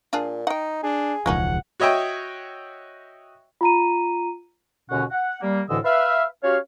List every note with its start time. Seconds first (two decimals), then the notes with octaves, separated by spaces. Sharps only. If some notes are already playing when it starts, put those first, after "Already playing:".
0.13 A#2 D4 F4 G#4
0.47 D#4 F#5 G5
0.83 D4 G#4
1.26 E1 C#2 F3 A#3 C#4 D#4 F#5
1.80 F#4 C#5 D#5 E5 G5
3.61 F4 A#5 D#7
4.89 D#2 B2 D3 C#4 F#4 F#5
5.11 F#5
5.42 G3 A#3
5.68 D2 A2 D3 E3 D#5 E6
5.84 B4 E5 F5
6.43 C#4 F#4 G4 C#5 F5